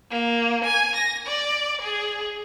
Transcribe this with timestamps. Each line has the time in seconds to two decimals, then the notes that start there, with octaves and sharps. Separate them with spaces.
0.11 A#3
0.65 G#5
0.96 A#6
1.27 D5
1.82 G#4